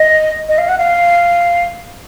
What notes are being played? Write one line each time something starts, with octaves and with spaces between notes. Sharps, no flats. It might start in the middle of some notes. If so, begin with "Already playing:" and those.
Already playing: D#5
D#5
F5
F#5
F5